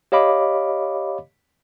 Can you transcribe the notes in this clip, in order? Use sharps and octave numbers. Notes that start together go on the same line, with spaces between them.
G4 C#5 D#5 F5 B5 D6